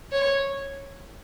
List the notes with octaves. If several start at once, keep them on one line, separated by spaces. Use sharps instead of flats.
C#5